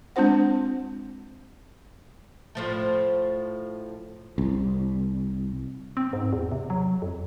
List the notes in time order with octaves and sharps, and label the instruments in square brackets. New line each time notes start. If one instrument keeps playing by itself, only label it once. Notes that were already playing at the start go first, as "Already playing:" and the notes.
[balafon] G#3 C4 D4 F4 C5 F#5
[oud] A2 F3 A3
[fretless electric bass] C2
[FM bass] C4
G#2
E2
C3
F#3
F2